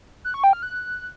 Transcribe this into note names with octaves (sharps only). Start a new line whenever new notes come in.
F#6
C#6
G5
F6
F#6